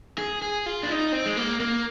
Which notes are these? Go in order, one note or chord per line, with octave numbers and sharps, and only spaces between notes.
G#4
G#4
F4
D4
D#4
C4
G#3
A#3
A#3